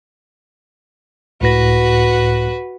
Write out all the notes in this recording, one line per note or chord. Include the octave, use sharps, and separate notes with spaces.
C#2 A2 F#4 B4 A#6